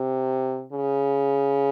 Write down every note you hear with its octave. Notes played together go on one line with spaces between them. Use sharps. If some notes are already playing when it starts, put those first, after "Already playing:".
Already playing: C3
C#3